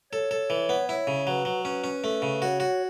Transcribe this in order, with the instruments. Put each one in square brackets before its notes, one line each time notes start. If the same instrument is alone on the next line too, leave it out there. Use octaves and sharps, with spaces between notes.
[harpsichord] A4 [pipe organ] C#5
[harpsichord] A4
E3
B3
[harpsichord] E4 [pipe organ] C#5
[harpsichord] C#3
[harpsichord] F#3 [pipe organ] B4
[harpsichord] F#3
[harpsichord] C#4 [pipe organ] B4
[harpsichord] C#4
A3
C#3
[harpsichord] F#4 [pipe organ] C#5
[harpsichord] F#4